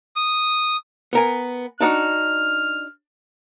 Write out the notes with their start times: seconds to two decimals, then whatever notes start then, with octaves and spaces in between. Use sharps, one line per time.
0.16 D#6
1.13 B3 A#4 G#5
1.81 D4 D#4 F#4 F6